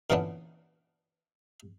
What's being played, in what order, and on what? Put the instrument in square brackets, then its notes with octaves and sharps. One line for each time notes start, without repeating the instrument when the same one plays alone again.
[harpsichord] A#2 D3 E3 B3 C#4 D4